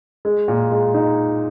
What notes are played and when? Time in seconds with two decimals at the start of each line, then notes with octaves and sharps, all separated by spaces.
0.25 G#3
0.48 A#2
0.71 G#3
0.94 D#4